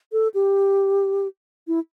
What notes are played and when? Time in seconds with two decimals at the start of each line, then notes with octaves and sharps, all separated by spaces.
0.12 A4
0.34 G4
1.68 E4